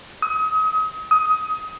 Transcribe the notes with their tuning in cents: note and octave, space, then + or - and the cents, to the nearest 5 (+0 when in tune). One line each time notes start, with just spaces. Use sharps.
D#6 +35
D#6 +20